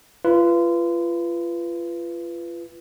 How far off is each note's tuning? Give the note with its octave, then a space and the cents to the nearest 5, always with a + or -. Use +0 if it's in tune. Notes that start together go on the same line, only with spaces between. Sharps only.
F4 -30 B4 +0